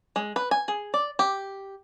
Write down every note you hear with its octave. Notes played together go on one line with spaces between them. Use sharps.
G#3
B4
G#5
G#4
D5
G4